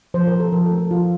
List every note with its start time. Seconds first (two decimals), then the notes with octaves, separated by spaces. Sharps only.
0.14 F3 C5
0.27 A#4
0.33 F3
0.40 A4
0.52 F3 A#4
0.65 A4
0.71 A3
0.78 A4
0.91 F3 F4